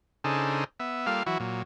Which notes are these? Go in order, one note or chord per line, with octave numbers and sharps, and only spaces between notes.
C#3 D4 D#4 G#4 A4 C5
B3 E5
G3 A#3 F4 A4 F5
E3 F#3 E4 F#4
A#2 F#3